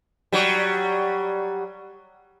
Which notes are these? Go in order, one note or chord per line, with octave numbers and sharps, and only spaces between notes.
F#3 G3